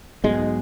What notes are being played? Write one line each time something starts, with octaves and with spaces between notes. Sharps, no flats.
B1 G#2 B2 G#3